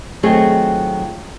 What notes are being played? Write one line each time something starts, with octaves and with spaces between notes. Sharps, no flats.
D#3 F#3 A3 C4 F4 G#4